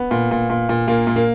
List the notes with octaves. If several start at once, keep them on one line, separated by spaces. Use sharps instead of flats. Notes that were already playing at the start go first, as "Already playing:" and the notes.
Already playing: B3
A#2
A#2
A#2
A#2
A#2 A#3
A#2
A#3